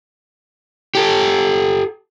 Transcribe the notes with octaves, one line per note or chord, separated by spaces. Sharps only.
G4 A4